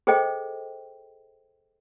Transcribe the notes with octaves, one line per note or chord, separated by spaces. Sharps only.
G#4 A4 C5 D#5 G5